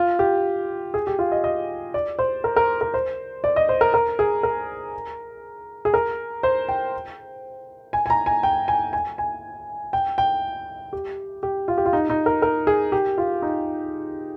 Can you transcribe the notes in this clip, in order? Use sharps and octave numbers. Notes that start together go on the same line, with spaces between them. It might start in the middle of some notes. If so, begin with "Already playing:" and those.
Already playing: F4
G4
G#4
G4
F4
D#5
D#5
D5
C5
A#4
A#4
A#4
C5
D5
D#5
C5
A#4
A#4
G#4
A#4
G#4
A#4
C5
G5
G#5
G#5
A#5
G#5
G5
G#5
G#5
G#5
G5
G5
G4
G4
F4
G4
F4
D#4
D#4
A#4
A#4
G#4
G4
F4
D#4